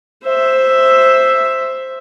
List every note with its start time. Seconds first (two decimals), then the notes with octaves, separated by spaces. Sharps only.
0.23 C5 E5